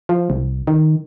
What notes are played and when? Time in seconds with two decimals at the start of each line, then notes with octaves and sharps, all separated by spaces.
0.09 F3
0.30 C2
0.67 D#3